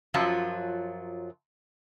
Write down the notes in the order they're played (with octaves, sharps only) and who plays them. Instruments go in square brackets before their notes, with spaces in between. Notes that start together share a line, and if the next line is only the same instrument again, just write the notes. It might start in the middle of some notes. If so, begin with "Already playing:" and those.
[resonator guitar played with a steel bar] F#2 F3 F#3 F4 A5